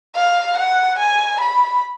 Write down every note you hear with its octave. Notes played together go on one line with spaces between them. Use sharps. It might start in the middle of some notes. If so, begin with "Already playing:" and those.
F5
F#5
G#5
B5